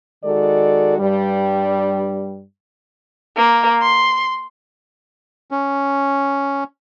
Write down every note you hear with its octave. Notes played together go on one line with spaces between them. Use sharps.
D#3 G#3 F#4 A4 D5
G2 G3
A#3
C6
C#4